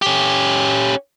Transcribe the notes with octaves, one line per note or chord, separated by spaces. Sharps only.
C#4 G4